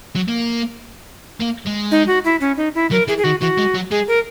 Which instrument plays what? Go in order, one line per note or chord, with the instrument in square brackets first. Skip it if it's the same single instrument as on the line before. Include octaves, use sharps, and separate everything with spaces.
[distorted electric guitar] F#3
A#3
A#3
G#3
[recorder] D#4
F#4
E4
C#4
D#4
E4
[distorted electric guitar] F#3 [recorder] A#4
[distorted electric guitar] E3 [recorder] G#4
[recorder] G#4
[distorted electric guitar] D#3 [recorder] F#4
[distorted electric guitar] E3 [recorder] F#4
[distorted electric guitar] G#3
F#3
[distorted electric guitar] G#3 [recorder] G#4
[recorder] A#4